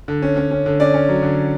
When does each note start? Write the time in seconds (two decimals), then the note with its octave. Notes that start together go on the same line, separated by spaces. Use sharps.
0.08 D3
0.22 C#4
0.37 C#4
0.51 C#4
0.66 D3
0.80 C#4 D5
0.94 C#4
1.09 F#3
1.23 D3